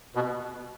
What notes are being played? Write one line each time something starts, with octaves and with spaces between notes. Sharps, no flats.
B2